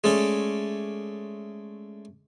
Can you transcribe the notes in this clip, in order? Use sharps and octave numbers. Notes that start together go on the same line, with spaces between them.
G#3 A3 C#4 D5 D6